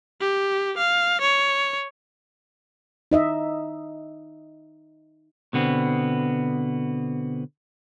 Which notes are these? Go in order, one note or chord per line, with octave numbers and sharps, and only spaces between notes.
G4
F5
C#5
D#4 D#5 E5
B2 D3 B3 C4